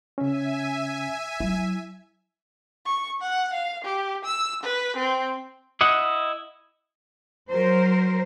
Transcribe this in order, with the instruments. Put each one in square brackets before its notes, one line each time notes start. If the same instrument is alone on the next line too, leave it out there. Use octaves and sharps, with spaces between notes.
[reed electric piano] C#3 C#4 [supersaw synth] E5 G#5
[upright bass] F#3 [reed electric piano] E4
[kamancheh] C#6
F#5
F5
G4
E6
B4
C4
[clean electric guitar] E4 D#5 F#5
[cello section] F#3 A#4 C5